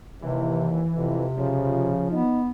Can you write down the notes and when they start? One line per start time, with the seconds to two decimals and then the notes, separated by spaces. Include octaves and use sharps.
0.22 D#2 C3 E3
0.96 F2 C3
1.37 C#3 F3
2.11 B3 D#4